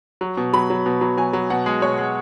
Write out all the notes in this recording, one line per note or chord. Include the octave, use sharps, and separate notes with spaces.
F#3
B2
F#3 B5
F#3
B2
F#3
F#3 G#5
F#3
B2 F#5
G#3
B2 C#5
G#3